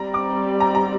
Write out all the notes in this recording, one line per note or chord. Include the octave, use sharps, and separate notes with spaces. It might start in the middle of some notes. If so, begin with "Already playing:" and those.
Already playing: G3 C4 G4 D5 A#5
D6
A#5
A#5